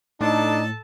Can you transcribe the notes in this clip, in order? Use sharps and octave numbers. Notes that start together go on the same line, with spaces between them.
A2 D4 D#4 A4 A5